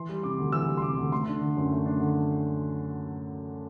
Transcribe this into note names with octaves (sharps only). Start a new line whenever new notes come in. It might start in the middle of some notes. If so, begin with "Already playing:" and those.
Already playing: E3 C6
G3
C3 D6
D2
E3 E6
G3
C6
C3 D6
D2
A3 C6
D4
D3
F#2
A3
D4
D3